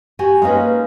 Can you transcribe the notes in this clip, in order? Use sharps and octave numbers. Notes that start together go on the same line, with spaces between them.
F#4 G4 G#5
G#3 A#3 C#4 D#4 B4